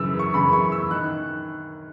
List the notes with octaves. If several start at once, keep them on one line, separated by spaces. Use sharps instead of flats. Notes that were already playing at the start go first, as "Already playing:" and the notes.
Already playing: F#2 C#3 E3 E6
C#6
F#2 C#3 E3 B5
C#6
E6
D#3 F#6